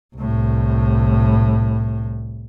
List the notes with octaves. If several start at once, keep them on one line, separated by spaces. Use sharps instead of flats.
C2 A2